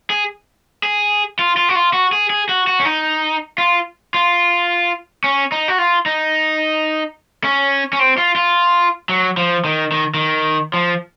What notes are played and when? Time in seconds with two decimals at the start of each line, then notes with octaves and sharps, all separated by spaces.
0.10 G#4
0.83 G#4
1.39 F4
1.57 F4
1.69 F#4
1.75 F4
1.93 F#4
2.13 G#4
2.30 G#4
2.49 F#4
2.67 F#4
2.80 C#4
2.85 D#4
3.58 F4
4.14 F4
5.24 C#4
5.52 D#4
5.68 F#4
5.78 F4
6.06 D#4
7.44 C#4
7.93 C#4
7.99 C4
8.18 F4
8.36 F4
9.09 F#3
9.37 F3
9.64 D#3
9.92 D#3
10.14 D#3
10.74 F3